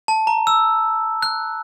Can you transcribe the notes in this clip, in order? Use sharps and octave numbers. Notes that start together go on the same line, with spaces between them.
A5
A#5
E6
F#6